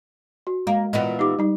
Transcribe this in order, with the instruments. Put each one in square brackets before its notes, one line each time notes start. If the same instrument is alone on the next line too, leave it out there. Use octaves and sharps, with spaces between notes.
[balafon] F#4
[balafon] G#3 [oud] A#3
[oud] A#2 E3 B3 [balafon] D#5
[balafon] D#4 G4 D6
G3 D#4